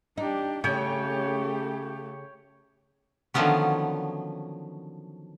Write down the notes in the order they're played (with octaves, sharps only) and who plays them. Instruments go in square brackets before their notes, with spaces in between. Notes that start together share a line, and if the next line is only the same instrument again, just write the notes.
[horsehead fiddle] D4 G4 [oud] D#4
[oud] C#3 [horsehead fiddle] A3 G4 [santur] C#5 G5
[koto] D3 D#3 F3 F#3 B3 C#4